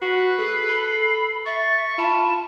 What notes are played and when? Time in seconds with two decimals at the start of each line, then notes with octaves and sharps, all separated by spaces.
0.02 F#4 B4 C7
0.39 G#4 A4 C7
0.69 B5
1.46 E5 C#6 A6
1.98 F4 A5 B5